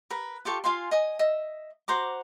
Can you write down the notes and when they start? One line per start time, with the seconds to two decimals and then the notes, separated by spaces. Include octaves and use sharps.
0.10 A#4 B4 B5
0.45 F4 G4 A4 C#6
0.64 F4 F5 G#5 C6
0.91 D#5 G#5 D#6
1.19 D#5 E5
1.88 F#4 C5 A#5 D6